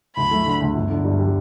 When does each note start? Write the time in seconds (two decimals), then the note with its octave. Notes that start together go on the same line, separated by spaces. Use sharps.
0.16 D2 B5
0.31 A3
0.46 D3
0.61 D2
0.75 G1
0.89 D3
1.04 G2
1.19 G3